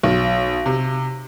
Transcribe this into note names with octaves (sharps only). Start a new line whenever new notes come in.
B1
C3